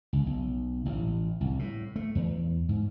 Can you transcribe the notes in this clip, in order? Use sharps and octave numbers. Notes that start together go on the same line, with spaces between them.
C#2
B1
A1
C2
A2
A3
E2
G#2